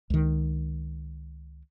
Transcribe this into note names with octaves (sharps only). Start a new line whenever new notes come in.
C#2 D#3